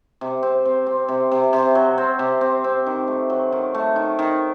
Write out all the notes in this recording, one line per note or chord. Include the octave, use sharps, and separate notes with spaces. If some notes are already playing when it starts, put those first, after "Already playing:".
C3
C4
C4
C4
C3
C3
C3
F#3
C4
C3
C4
C4
D#3
A3
F#3
D#3
A3
D#3
D#3